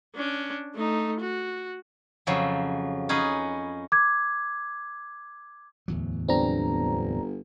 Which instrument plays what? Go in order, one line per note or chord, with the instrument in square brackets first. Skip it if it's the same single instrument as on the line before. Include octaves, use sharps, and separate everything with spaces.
[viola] C#4 D4
A3 D#4
F#4
[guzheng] F2 C#3 F3 F#3
C#4 D#4 G#4 B4
[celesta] D6 G#6
[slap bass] D1 E2 F#3
[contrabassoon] G1 [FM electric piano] C4 D4 A#5